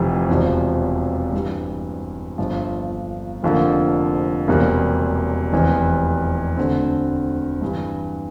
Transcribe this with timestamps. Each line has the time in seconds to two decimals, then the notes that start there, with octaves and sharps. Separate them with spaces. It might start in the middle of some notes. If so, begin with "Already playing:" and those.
Already playing: F1 F2 C3 E3
0.29 E1 E2 C3 F3
1.33 G2 E3 G3
2.38 G1 G2 F3
3.43 F1 F2 D3 F3 A#3
4.48 E1 E2 C3 G3 A#3
5.52 F1 E2 C3 E3
6.57 D2 D3 A3 C4
7.62 G2 E3 G3